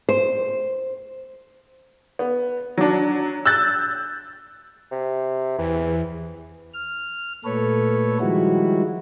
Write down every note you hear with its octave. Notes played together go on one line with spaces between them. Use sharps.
C5
B3
F#3 D4
E6 F#6 G6 A6
C3
E2 E3
F6
A#2 A3 A4 B4 C#5
D#3 F3 G3 G#3 E4 F#4